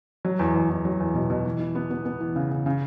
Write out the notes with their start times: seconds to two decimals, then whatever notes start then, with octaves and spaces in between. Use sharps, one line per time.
0.25 F#3
0.39 E2
0.54 E2
0.70 E2
0.85 F#3
1.00 E2
1.15 B2
1.30 B2
1.45 E3
1.60 E3
1.75 B3
1.90 B3
2.05 B3
2.21 E3
2.36 C#3
2.51 C#3
2.66 C#3